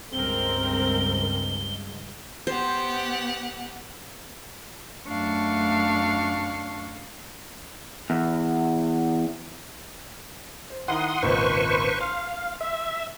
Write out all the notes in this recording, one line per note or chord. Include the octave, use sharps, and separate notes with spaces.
C#2 G2 C4 A#4 G7
B3 G4 C5 F#5
F#2 A3 D4 F5 C#6
E2
C5
D#3 E4 A#4 F#5 C6 D#6
G#1 C#2 A#2 B4 C5 C#6
F5 C6
E5